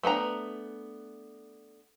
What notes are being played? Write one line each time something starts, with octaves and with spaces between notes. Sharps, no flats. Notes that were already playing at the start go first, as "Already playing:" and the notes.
A3 B3 D4 A#5